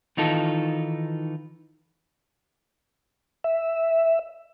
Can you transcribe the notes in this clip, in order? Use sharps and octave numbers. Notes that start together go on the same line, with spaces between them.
D#3 E3 D#4 F4 A4
E5